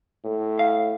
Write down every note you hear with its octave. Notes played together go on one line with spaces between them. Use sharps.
A2
F5